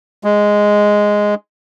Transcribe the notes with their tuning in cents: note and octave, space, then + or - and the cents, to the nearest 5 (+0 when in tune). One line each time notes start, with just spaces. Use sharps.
G#3 -5